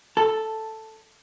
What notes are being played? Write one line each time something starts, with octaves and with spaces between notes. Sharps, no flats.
A4